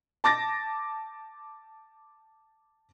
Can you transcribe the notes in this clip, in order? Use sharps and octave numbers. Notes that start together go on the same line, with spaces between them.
A5 D6 A6 A#6